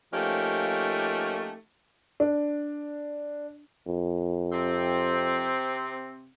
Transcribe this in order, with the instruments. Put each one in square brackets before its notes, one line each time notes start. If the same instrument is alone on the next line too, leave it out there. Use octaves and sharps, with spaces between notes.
[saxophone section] F3 A3 A#3 C#4 D#4 G4
[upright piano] D4
[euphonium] F2
[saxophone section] C3 C4